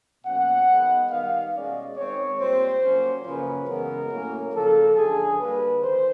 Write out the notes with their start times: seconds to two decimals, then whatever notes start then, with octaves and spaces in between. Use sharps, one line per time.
0.24 B2 F#3 A#3 C#4 F#5
0.68 D#3 G#3 B3
1.10 D#3 G3 B3 F5
1.54 B2 G#3 C#4 D5
1.96 D#3 G#3 C4 C#5
2.39 A#2 G3 C4 C5
2.82 A#2 F#3 A#3 C#4
3.24 F#2 C#3 F3 A#3 C#4 B4
3.67 F#2 C#3 E3 G#3 B3 A#4
4.10 A2 F#3 A#3 C#4
4.53 C#3 F3 A#3 A4
4.96 F#2 D3 F3 G#4
5.38 D3 G3 A#3 B4
5.82 D#3 C5